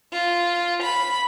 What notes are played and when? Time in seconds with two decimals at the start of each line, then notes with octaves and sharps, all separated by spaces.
0.13 F4
0.82 B5